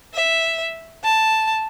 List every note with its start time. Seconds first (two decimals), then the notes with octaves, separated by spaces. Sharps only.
0.14 E5
1.04 A5